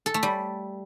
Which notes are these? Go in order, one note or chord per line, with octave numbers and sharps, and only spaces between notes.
A4
A3
G3